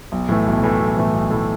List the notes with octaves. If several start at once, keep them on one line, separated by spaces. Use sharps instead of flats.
B1
A2 E3 A3
B1
A2 E3 A3
B1
A2 E3 A3
B1
A2 E3 A3